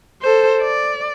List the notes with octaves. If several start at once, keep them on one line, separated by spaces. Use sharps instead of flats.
A4 C5
D5